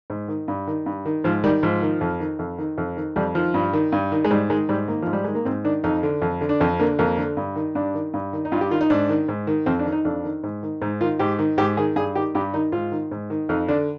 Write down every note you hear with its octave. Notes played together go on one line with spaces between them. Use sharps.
G#2
D#3
G2
D#3
G2
D#3
G#2 F3
D#3 G3
G#2 F3
D#3
F2
D#3
F2
D#3
F2
D#3
F2 G3
D#3 F3
G2
D#3
G2
D#3
G#3
G#2 G3
D#3 G#3
G#2 G3
D#3 A#3
G#2 F3
G3
D#3 G#3
A#3
G#2 C4
D#3 D4
F2 D#4
D3
F2
D3
D4
F2 C4
D3 A#3
F2 A#3
D3
G2
D#3
G2 D4
D#3
G2
D#3
D#4
G2 F4
G4
D#3 F4
D#4
G#2 D4
D#3
G#2
D#3
F2 C4
D4
D#3
D#4
F2 D4
D#3
G#2
D#3
G#2 D#4
D#3 F4
G#2 G4
D#3
G#2 G4
D#3 G#4
G2 G#4
D#3 G4
G2 G4
D#3 D#4
G#2 F4
D#3
G#2
D#3
F2 D#4
D3 D4